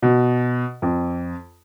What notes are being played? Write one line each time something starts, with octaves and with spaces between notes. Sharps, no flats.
B2
F2